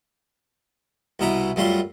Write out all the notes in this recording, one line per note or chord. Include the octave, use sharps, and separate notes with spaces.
C2 B2 E4 A#5 B5
F#2 G3 A3 F4 C6